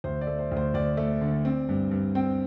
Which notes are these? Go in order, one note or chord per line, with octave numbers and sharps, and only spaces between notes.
D2 C5
D5
A3
C5
D2
C5
D2 D5
A3
D3
C4
G2
G2
C4 G5